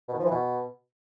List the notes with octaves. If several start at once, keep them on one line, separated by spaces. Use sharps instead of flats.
B2
D#3
F3
E3
B2